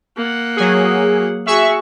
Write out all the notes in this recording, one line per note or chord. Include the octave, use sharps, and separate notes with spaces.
A#3 F#5
F#3 G#4
F#4 G#4 E5 C#6